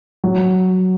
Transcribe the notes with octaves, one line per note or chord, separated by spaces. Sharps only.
F#3